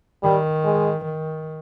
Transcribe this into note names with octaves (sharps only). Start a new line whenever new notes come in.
D#3 G3
G#3
D#3